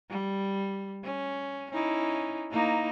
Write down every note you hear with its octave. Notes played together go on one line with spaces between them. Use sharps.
G3
C#4
C#4 D#4 E4
A#3 D#4 E4